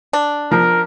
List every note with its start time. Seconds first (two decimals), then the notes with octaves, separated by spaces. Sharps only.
0.13 D4
0.51 F3 A#4